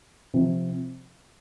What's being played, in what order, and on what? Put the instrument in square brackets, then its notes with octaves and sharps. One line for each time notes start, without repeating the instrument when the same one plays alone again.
[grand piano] C3 F3 C4